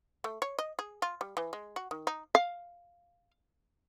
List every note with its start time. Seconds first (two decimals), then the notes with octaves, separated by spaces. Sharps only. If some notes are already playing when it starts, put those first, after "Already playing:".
0.24 A3
0.42 C#5
0.59 D#5
0.79 G#4
1.02 F4
1.21 G3
1.37 E3
1.53 G#3
1.76 F#4
1.91 D#3
2.07 D#4
2.35 F5